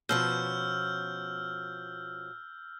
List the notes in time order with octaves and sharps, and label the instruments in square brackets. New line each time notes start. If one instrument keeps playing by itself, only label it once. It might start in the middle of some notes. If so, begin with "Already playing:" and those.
[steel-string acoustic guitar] B2 F3 C#4 [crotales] E6 F6 G6